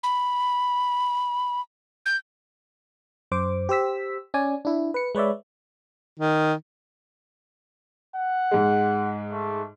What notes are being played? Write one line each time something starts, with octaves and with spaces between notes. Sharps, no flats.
B5
G6
F#2 C5 D6
G4 C5 E6 B6
C#4 D5 G#5
D4 E4
B4 C#7
G#3 B4 C#5 D5 E5
D#3
F#5
G#2 G#3
A3